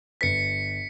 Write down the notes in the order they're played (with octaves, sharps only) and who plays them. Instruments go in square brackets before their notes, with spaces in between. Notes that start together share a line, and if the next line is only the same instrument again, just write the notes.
[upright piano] G1 B4 A6 [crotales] B6 C#7